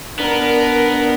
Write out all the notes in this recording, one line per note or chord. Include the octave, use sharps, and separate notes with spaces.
B3 D4 A#4